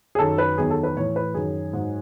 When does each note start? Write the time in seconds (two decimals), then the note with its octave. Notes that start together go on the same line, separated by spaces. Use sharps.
0.15 G#4
0.19 F#2 D#3 F#3 A4
0.38 B4
0.58 E2 D#3 F#3 G#4
0.70 A4
0.83 B4
0.96 A2 E3 C#5
1.16 B4
1.34 F#2 D#3 F#3 G#4
1.73 G#2 F#3